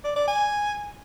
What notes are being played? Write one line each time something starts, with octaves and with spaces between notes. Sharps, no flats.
D5
D5
G#5